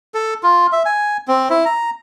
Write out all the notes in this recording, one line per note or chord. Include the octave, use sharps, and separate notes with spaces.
A4
F4
E5
G#5
C4
E4
A#5